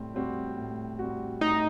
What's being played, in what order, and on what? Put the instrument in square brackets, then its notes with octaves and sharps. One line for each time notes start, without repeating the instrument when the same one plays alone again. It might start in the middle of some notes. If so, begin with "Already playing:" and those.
Already playing: [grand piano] A2 G3 C4
G3 C4 F#4
A2
G3 C4 F#4
[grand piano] A2 [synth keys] D#4